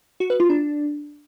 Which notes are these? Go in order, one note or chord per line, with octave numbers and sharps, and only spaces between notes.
F#4
B4
F4
D4